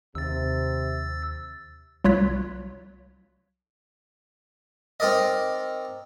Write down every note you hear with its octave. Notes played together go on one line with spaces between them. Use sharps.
D#2 C3 E6 A6
C2 F#3 F4 C#5 F#6 B6
C4 D#4 A#4 D5 D#5